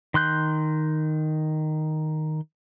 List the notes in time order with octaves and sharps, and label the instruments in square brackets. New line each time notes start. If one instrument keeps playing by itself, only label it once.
[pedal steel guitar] D#3 C6 F#6 G6